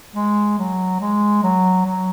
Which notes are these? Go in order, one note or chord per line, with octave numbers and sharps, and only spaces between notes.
G#3
F#3
G#3
F#3
F#3